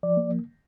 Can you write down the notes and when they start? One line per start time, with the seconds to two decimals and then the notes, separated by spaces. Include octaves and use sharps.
0.03 F3 D5
0.17 A#3